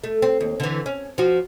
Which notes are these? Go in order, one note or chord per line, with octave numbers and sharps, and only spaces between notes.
A3
C4
D#2
D3 E3
C#4
F3 F#4